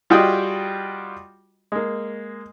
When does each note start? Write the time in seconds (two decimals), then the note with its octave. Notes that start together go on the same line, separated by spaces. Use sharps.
0.10 G3 F4 F#4 G#4 D#5 G5
1.72 G#3 A#3